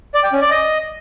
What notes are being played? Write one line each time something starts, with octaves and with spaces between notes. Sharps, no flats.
D5
G5
C#4
D5
D#5